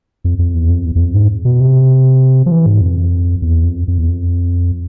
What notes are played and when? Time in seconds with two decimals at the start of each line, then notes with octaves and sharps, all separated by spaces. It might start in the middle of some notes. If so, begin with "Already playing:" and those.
0.24 F2
0.39 F2
0.54 E2
0.70 F2
0.85 E2
0.95 E2
1.00 F2
1.14 G#2
1.45 B2
1.61 C3
2.46 F3
2.52 E3
2.66 G#2
2.81 F2
3.42 E2
3.64 F2
3.88 F2
3.98 E2
4.08 F2